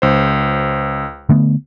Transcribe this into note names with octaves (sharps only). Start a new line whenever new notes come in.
C#2 C5
D3 A3 B3